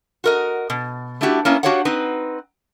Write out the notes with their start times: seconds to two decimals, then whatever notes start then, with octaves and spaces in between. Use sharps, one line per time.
0.24 F#4 A#4 D#5
0.70 B2
1.21 A3 D4 E4 F#4 G4
1.45 A#3 B3 C#4 E4
1.63 D4 F#4 G4 C#5 F5 F#5
1.85 C4 D#4 B4